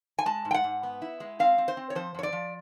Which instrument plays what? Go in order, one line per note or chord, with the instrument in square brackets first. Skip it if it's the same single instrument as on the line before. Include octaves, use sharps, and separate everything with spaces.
[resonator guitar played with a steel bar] G#5
G#3 A5
G#2
G5
F#5
G#2
B3
E4
G#3
C4 F5
C4
C5
C4
C#5
F3 C5
F2 C#5
D5
F3